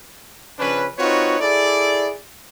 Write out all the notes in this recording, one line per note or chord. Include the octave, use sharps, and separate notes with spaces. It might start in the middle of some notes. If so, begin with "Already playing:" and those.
C#3 F3 C#4 D4 B4
C4 D#4 F4 F#4 B4 C#5
E4 G#4 A4 D5